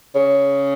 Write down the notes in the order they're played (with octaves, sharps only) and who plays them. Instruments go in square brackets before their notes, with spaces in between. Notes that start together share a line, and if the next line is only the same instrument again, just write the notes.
[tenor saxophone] C#3